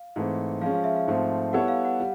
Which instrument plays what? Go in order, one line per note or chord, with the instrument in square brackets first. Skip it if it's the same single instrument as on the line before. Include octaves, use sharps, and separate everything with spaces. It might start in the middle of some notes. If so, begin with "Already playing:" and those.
Already playing: [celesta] F5
[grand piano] G#2 E3 A3 C4
[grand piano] F3 G#3 C#4 [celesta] F5
[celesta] F5
E5
F5
[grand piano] G#2 F3 A3 C4
[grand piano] G3 B3 E4 A4 C#5 [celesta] F#5
[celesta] F5
F#5
[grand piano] G3